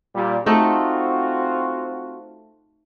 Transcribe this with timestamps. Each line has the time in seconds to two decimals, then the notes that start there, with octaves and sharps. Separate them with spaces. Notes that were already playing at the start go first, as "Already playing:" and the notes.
0.15 A#2 G3
0.46 A3 C4 D#4 F4 F#4 A4